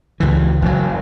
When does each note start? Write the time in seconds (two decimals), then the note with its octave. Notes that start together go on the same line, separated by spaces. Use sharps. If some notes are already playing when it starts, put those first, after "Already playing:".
0.20 C#2 E3
0.62 F#1 B2 F#3